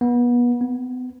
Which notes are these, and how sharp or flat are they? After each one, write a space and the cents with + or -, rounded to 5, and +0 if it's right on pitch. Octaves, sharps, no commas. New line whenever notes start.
B3 -30
B3 +35